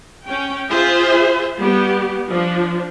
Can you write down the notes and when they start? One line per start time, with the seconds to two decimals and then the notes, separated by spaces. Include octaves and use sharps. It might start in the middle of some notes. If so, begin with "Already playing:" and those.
0.24 C#4 G5
0.70 F4 G#4 C5 E5
1.57 G3 B3 G4
2.29 F3 D4